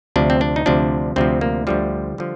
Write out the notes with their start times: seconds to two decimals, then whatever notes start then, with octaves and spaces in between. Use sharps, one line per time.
0.16 D2 C3 F3 D4
0.30 C4
0.41 D4
0.56 D#4
0.66 D2 C3 F3 D4
1.16 D2 C3 F3 C4
1.41 A#3
1.67 D2 D3 F3 G3
2.18 D3 F3